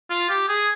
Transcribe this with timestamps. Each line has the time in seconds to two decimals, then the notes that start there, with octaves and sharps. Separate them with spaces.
0.10 F4
0.30 G4
0.49 G#4